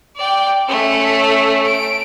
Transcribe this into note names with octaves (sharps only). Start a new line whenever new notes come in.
D5 G5
A3 C#4
D7